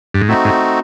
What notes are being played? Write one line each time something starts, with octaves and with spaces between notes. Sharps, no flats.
G2
G#2
A2 A3 C4 D#4 F#4
G#2